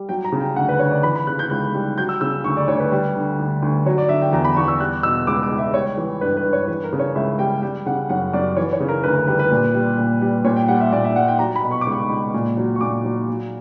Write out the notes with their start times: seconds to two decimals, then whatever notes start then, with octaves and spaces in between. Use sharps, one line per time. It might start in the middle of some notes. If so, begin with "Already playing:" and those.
Already playing: G3
0.09 F#3 G5
0.25 A#5
0.32 C#3
0.40 G5
0.56 D2 F#5
0.69 B4
0.79 D2 C#5
0.91 D5
1.03 E3 B5
1.15 B5
1.27 C#3 F#6
1.39 G6
1.50 C#2 F#6
1.74 G3
1.97 F#3 G6
2.09 E6
2.21 C#3 E6
2.44 D2 C#6
2.57 D5
2.68 D2 C#5
2.80 B4
2.92 G3
3.15 D3
3.39 D2
3.62 D2
3.86 F#3 C#5
3.98 D5
4.09 D3 E5
4.22 G5
4.32 E2 A#5
4.45 B5
4.57 E2 C#6
4.68 E6
4.80 G3 F#6
5.03 B2 E6
5.27 C#2 D6
5.43 D6
5.51 C#2
5.58 E5
5.74 G3 C#5
5.97 E3
6.21 G2 B4
6.37 B4
6.45 G2
6.53 C#5
6.68 E3 B4
6.84 A#4
6.93 C#3
6.99 C#5
7.15 C#2 E5
7.39 G3 G5
7.62 G3 G5
7.86 C#3 F#5
8.09 F#2 F#5
8.33 F#2 D5
8.57 E3 C#5
8.73 C#5
8.80 C#3
8.89 A#4
9.03 D2 B4
9.16 A#4
9.27 G3 B4
9.39 B4
9.51 A#2
9.74 G3
9.98 A#2
10.21 G3
10.45 A#2 C#5
10.56 G5
10.68 G3 F#5
10.80 E5
10.92 A#2 D5
11.04 E5
11.16 G3 F#5
11.28 G5
11.39 F#3 A#5
11.56 B5
11.63 B2
11.71 C#6
11.81 D6
11.87 C#2
11.92 C#6
12.10 C#2
12.34 A#2
12.57 F#3
12.75 C#6
12.81 A#2 D6
13.04 F#3
13.28 F#3